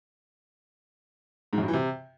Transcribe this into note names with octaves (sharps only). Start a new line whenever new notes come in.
G#2
F#2
G2
E3
C3